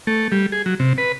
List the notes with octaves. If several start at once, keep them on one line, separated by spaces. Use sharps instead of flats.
A3
G3
G#4
F#3
C3
B4